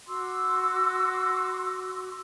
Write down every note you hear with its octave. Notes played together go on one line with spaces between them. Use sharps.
F#4 C6 D6 E6